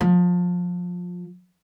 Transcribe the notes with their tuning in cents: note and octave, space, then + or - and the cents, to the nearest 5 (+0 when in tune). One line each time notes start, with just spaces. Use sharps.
F3 +25